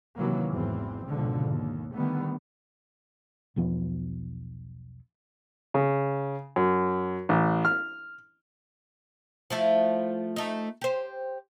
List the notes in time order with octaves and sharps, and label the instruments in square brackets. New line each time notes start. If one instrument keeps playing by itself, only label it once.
[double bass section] C3 D#3 E3 F#3 A#3
G#1 E2 E3 C4
G#1 C#2 B2 D3 F3
D#2
D3 D#3 G3 A3 B3
[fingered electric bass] B1 E2 F3 B3
[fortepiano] C#3
F#2
A1
F6
[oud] F3 A3 E4
A3 D#4
G4 C5